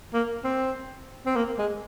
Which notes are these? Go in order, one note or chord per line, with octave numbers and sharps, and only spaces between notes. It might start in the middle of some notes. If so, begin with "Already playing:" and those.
A#3
C4
C4
A#3
G#3